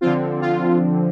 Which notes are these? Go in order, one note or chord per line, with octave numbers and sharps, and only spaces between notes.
D3 F3 C4 F4
F4